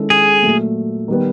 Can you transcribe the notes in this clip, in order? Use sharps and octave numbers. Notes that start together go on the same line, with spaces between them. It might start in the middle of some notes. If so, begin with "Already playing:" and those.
Already playing: D#3 G#3 C#4 E4 A4
G#4
A#2 F#3 A3
D#3 G3 B3